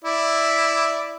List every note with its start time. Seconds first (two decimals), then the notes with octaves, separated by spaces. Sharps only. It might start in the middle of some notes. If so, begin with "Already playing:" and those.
0.05 E4 D5 E5